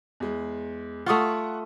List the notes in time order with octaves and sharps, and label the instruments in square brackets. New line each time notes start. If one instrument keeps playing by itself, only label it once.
[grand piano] E2 G#3
[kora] A3 F4 [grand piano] F#5 C#6 D#6